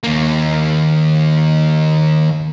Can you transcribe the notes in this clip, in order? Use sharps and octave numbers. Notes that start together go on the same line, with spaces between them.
D#2 A#3